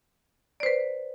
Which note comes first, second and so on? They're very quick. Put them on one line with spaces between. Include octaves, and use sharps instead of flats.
D5 C5 B4